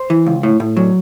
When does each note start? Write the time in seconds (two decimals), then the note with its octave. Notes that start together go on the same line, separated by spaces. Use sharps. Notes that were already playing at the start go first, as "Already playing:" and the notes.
Already playing: C5
0.10 E3
0.26 C#2
0.43 A2
0.60 A2
0.77 F#3